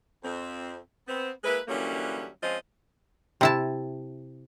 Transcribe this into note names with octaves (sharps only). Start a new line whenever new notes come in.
F2 C4
B3 C4
G#3 A#3 E4 B4
D3 E3 F#3 G3 A#3 C#4
F3 G#3 C4 C#4 F4 D#5
C3 E4 A5